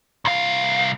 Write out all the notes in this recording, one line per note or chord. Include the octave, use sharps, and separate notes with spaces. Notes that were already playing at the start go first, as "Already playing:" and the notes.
C2 F5